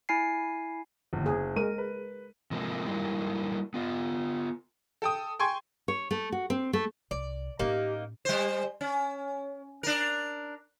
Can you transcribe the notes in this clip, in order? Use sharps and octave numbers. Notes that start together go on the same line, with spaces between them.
E4 G#5 C7
G1 D#2
F#1 G#4
G#3 A#4 D#7
B4
C3 F3 G#3 A#3 C4 D#4
F#3 G3 A#3 D#4 E4
B3 F4
A4 G5 D#6
G5 G#5 C6 C#6 G#6
C#5
A3
F#4
C4
A3
C2 D5
A2 A#3 C#4 D#4 G4
G3 C5
C#4
D4 A#4